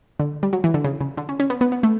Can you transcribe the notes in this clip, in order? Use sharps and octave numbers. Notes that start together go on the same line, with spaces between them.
D3
G3
F#3
E3
D3
C#3
C#3
D3
C#4
C#4
B3
B3
B3
A3